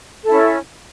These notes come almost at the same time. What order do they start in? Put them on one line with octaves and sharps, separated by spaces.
A4 E4 C#4